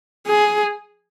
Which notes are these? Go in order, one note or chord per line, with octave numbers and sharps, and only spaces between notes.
G#4